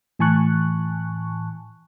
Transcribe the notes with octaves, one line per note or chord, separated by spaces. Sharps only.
A2 E3 G#5 A5 C#6 F#6